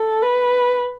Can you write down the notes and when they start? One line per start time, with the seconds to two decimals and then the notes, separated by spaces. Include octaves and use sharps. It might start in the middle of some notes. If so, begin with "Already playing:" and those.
Already playing: A4
0.22 B4